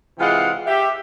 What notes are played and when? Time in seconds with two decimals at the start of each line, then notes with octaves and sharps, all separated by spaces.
0.19 C3 E3 G#3 F4 F5 F#5
0.66 G4 E5